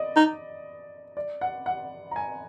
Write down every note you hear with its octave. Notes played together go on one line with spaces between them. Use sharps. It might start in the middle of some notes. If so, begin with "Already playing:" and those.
Already playing: D5 D#5
D#4
D5
F#5
F#5
A#5
G#5